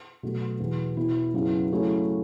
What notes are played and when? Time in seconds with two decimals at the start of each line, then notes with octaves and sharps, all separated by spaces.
0.23 B2 F#3 A3 F#4
0.60 E2 B2 B3
0.97 B2 B3 E4
1.34 F#2 C#3 F#3 B3 E4
1.71 C#3 F#3 A3 C#4 E4